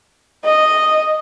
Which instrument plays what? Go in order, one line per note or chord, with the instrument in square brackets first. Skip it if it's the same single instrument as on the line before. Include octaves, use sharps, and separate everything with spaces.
[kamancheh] D#5